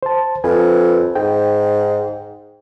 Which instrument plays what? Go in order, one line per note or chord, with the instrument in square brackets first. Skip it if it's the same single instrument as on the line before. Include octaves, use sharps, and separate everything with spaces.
[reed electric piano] C5 A5
[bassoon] F2 [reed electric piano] B4 G#5
[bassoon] G#2 [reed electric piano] G5